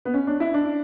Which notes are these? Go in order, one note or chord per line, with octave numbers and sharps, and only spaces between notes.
B3
C#4
D4
E4
D4